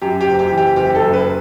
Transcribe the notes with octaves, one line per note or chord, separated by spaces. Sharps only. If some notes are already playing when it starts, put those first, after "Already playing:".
F#2 G4
G4
F#1
G4
E3
G4
F#1 G4
A4
F#2
B4